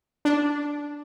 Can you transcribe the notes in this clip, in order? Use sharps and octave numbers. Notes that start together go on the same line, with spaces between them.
D4